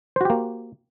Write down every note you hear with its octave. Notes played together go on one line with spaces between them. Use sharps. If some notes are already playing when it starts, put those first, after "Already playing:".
A#3 F#4 G4 C5